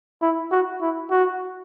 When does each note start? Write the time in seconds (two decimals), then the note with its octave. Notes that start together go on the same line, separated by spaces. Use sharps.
0.22 E4
0.51 F#4
0.81 E4
1.11 F#4